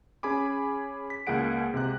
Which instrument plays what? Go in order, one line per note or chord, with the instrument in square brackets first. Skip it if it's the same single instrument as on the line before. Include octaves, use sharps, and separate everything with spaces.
[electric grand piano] C#4 G#4 G#5 B5 D6
B6
C#2 A#3 G#4 F#5 D7
C3 G#3 G4 F#6